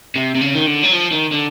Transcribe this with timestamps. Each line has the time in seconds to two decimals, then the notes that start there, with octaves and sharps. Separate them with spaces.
0.16 C3
0.35 C3
0.41 C#3
0.56 D#3
0.67 D3
0.84 F#3
0.94 F3
1.13 D#3
1.32 D3